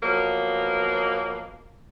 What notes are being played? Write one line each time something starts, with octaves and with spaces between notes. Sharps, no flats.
B2 F3 F#3 A#3